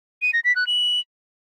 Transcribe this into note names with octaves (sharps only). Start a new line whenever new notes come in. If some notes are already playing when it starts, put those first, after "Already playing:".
D#7
A#6
B6
F#6
F#7